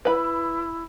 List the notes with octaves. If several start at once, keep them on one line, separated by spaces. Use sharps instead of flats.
E4 B4 B5